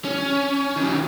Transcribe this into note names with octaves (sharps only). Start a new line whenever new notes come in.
C#4
D#3 F#3